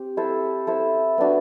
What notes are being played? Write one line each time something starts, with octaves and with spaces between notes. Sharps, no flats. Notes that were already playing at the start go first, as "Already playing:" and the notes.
Already playing: C4 G4
E4 A4 C5 E5
E4 A4 C5 E5
B3 D4 F#4